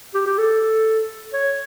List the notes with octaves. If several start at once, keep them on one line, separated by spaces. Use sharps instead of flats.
G4
G4
A4
C#5